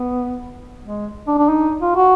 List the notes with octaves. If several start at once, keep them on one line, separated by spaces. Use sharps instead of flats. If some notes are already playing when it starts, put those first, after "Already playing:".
Already playing: B3
G#3
D4
D4
D#4
F4
F#4